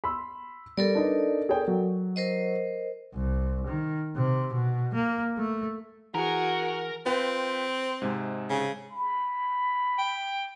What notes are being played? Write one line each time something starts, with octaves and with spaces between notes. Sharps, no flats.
B5 C6 E6
G3 A4 A#4 D5
D4 D#4 B4
G#4 C#5 G5
F#3
A#4 C5 D#5
C2
D#3
C3
B2
A#3
A3
E3 F#4 G#4 A#4
C4 F4 B4 G5
G#2 C3 G#3
C#3
B5
G5